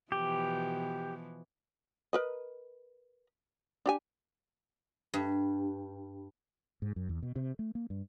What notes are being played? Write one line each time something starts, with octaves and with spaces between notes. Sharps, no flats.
B2 E3 F3 G4
A#4 B4 D#5
D4 G4 G#5
G2
G#2
F#2
E2
B2
C3
A3
A#3
G2